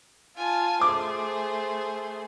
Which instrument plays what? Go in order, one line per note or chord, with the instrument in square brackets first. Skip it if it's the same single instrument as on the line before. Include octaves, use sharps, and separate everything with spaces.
[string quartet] F4 G#5 A5
[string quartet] A3 G#4 C5 [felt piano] D6